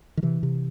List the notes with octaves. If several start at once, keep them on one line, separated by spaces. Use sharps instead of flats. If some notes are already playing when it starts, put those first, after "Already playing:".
D#3
C3 E3
C3